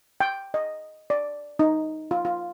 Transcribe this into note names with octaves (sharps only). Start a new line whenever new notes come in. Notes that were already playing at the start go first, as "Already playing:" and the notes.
G5
D#5
D5
D#4
F4
F4